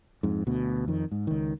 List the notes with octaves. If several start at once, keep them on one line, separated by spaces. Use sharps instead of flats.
F2 G#2
D2 B2
F2 D#3
G#2
C#2 D#3